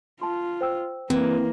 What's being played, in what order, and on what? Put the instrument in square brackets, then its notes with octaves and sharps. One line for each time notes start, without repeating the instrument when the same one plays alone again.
[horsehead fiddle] F4 [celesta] A5 C6
[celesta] C5 G5 E6
[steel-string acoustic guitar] E3 [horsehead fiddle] A#3 [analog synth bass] C4